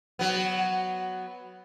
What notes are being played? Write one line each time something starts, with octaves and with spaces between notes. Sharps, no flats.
F#3 B3